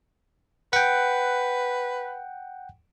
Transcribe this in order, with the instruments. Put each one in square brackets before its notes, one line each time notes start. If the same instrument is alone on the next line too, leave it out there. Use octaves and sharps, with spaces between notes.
[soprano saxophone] B4 [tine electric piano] F#5 G5